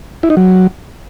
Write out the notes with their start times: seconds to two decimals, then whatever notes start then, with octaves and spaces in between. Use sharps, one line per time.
0.23 E4
0.30 D#4
0.37 F#3